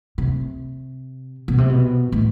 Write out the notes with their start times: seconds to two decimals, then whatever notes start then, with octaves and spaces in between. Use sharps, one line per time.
0.18 C3
1.48 B2
1.58 C3
1.69 B2
2.12 A2